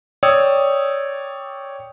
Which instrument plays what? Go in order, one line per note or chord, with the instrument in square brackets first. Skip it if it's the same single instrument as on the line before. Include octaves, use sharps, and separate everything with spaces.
[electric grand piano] C#5 D5 G5 D#6 E6 G#6